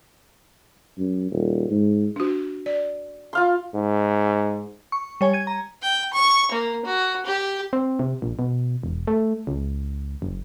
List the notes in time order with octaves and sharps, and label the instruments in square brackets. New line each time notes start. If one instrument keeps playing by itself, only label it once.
[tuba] F#2
D#1
G#2
[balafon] D4 F#4
D5
[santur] F4 F5 C6
[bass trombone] G#2
[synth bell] C#6
G3 C#5 G#5
G#6 D#7
A#5
[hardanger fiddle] G5
C#6
A#3
F#4
G4
[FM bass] C4
C3
A#1
B2
E1
A3
C#2
F#1